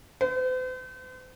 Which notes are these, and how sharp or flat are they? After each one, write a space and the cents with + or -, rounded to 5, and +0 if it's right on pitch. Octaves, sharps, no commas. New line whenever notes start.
C5 -45